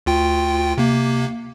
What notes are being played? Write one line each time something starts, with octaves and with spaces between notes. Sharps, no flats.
D2 F4 G5
C3 A#3